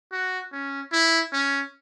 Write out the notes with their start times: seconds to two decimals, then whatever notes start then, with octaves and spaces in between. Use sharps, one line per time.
0.12 F#4
0.53 C#4
0.93 E4
1.33 C#4